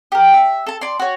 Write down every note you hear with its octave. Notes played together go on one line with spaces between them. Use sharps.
G4 A#4
E5
A4 A5
D5 C6
F#4 C#5